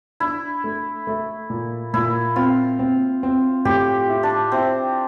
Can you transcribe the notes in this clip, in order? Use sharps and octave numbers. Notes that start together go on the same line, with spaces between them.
D4 E4
A3
A3
A#2
A#2 E4
C4 F4
C4
C4
A2 G4
E4
D4
C4 E4